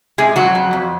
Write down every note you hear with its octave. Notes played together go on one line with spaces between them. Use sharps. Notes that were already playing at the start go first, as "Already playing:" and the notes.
C3 G#3 G#4
F2 F#3 F#4
F2
F2